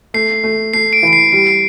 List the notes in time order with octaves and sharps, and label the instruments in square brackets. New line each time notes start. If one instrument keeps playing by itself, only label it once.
[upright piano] A3 [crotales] C7
[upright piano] A3
[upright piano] A3 [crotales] C7
[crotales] D7
[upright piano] E3 [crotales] D7
[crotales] C7
[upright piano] G3 [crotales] D7
[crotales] C7